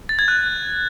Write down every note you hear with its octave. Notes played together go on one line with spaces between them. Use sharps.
A6
G#6
F#6